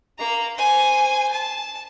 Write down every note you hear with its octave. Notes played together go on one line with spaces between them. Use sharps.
A#3 A#5
C5 G#5
A5